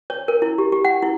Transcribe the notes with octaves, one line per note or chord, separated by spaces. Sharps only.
C#5
A#4
E4
G4
G4
F#5
E4